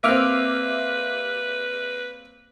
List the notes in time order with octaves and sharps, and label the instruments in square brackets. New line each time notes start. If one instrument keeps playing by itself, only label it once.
[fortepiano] A#3 C4 [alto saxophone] B4 [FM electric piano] E5 D6 F6